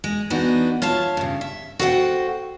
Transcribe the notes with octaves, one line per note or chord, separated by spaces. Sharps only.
G#3
E3 B3 D4 D#4 F#4
F4 C#5 E5 A5
G2 C#3
E5
F#4 A4 C5 C#5 F#5 G5